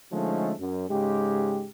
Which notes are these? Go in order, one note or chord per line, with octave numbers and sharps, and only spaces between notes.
D3 F3 G#3 A3 C#4 D#4
F#2
G#2 C#3 G#3 G4